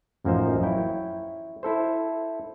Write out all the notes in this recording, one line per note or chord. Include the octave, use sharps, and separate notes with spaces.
A1 F#2 F3 A#3 D#4 C5
E4 C#5 G5
E4 A4 C5